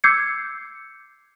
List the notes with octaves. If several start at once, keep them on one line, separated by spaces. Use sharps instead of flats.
D6 E6 G6 G#6 C7 C#7